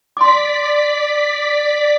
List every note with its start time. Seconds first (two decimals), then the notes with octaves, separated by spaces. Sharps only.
0.17 D5 C6 D6 B6